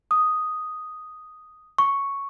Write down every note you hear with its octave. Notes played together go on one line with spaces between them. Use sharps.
D#6
C#6